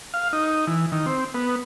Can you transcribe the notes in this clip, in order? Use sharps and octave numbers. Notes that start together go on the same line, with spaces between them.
F5
D#4
E3
D#3
C4
B3